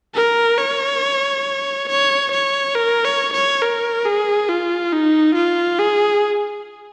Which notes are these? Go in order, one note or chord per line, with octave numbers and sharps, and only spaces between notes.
A#4
C#5
C#5
C#5
A#4
C#5
C#5
A#4
G#4
F4
D#4
F4
G#4